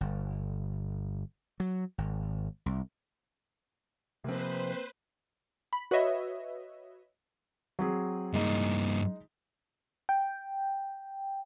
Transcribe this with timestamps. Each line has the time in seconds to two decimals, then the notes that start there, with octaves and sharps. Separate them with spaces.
0.01 G1
1.60 F#3
1.98 G#1
2.66 C2
4.24 C3 F3 A#3 C4 B4 C5
5.73 B5
5.91 F#4 B4 C#5 D#5 E5
7.79 F#3 C4 G#4
8.34 G2 G#3 A#3 D#4
10.09 G5